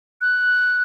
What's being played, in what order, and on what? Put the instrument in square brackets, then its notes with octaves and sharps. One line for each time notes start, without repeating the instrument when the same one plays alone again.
[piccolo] F#6